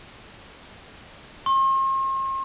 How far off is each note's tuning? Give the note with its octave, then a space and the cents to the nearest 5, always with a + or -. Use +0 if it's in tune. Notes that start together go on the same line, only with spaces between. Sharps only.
C6 +45